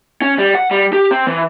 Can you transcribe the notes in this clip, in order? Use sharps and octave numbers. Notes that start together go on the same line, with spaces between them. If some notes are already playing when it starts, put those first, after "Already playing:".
C#4
G3
F#5
G3
G4
C4
E3